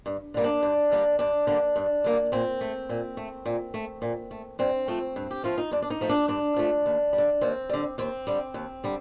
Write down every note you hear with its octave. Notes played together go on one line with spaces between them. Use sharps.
G2
D3 G3 A#3
D4
G2
D3 G3 A#3
G2 D4
D3 G3 A#3
G2
D3 G3 A#3
A#2 C4
A3
A#2
A3
A#2
A3
A#2
A3
G2 C4
F3 A3
G2
G4
F3 A3 F4
D#4
G2 D4
D4
D#4
F3 A3
D4
G2 D4
F3 A3
D#2
G3
D3
D#2 C4
D3 G3
D#2 C4
D3 G3
D#2
D3 G3